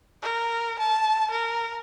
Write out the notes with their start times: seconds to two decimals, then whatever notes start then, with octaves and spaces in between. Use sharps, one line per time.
0.22 A#4
0.79 A5
1.31 A#4